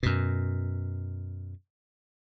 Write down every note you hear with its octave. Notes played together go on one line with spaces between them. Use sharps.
F#2 B2